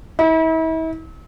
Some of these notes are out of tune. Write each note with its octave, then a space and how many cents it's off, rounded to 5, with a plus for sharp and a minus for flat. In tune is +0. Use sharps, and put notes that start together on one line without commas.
E4 -40